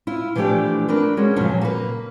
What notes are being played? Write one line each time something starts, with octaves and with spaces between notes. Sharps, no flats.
E4 F4
E3 F3 A3 D4 G4 D5
A3 D4 A#4 B4
G#3 C#4 F#4
F#2 A#2 C#3 F3 F#3
A#3 A4 B4